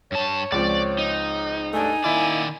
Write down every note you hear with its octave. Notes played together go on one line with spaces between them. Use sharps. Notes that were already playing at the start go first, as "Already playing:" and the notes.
G2 C#5 A5
C#2 F3 C4 D5
D#4
G2 A3 D4 G#5
D#3 A#3 D#4 E4 D5